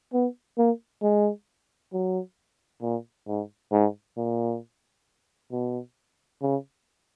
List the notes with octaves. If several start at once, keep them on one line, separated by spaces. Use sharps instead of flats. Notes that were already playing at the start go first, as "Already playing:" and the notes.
B3
A#3
G#3
F#3
A#2
G#2
G#2
A#2
B2
C#3